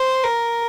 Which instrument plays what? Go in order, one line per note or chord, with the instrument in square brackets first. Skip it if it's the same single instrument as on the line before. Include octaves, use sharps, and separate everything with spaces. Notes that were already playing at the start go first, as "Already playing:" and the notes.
Already playing: [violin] C5
A#4